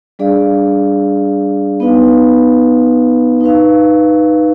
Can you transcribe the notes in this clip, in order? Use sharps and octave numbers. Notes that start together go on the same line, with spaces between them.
G3 D4 G#4 D5 F5
B3 D#4 B4 F5
D#4 B4 F5